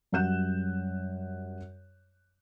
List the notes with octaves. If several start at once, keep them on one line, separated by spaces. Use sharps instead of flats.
F#2 G3 F#5 F#6 G6 E7